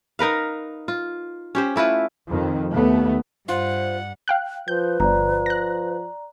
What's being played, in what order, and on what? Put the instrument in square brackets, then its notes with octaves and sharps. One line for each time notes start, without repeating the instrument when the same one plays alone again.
[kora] D#4 A#4 B4 F5
F4
C#4 G4 C5
A3 E4 F4 B4
[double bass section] F2 D#3
D#2 A3 B3
[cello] G2 [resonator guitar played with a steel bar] F4 [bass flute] C5 [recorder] F#5
[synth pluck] F5 G5 F#6
[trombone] F3 [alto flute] B4 [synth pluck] G6
[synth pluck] G1 [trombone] F3 [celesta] D5 A#5
[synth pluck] F#6 A#6